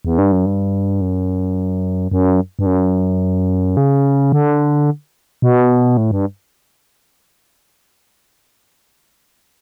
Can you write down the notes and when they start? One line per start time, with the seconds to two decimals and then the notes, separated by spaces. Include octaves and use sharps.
0.05 E2
0.18 G2
0.32 F#2
0.46 G2
1.01 F#2
2.11 F#2
2.59 G2
2.66 F#2
3.77 C#3
4.32 D3
5.42 B2
5.97 A2
6.11 G2